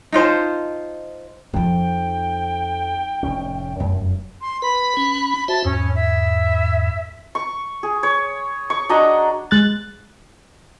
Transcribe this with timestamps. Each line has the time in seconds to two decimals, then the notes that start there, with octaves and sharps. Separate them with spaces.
0.12 D#4 F4 C5 A5
1.53 F2 F3 D#4 G5
3.23 F1 A2 C#4
3.80 F1 F#2
4.41 C6
4.62 B4 B5
4.97 C#4
5.48 F#4 C5 E5 A5
5.65 E2 G#2 C#4
5.95 E5
7.35 C#6
7.83 G#4
8.03 C#5
8.70 C#6
8.89 D4 F#4 D#5 A#5
9.51 G#3 F#6 A6